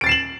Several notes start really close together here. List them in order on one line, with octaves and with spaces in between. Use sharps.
D7 A6 C7 E7 F#7